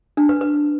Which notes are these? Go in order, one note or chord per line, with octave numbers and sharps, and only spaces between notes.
D4
B4
B4